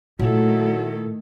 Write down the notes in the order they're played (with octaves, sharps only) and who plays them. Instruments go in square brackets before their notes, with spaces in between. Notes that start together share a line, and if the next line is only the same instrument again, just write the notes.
[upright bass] A#2 F4 [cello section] D#3 A3 [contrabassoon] F#3 [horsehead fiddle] E4 A4